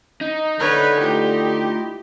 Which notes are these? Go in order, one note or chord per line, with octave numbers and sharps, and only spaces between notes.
D#4
D3 B4 C#5
A3 E4 F4 G4